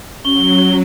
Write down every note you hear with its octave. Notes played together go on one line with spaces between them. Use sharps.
F#3 C#4 G7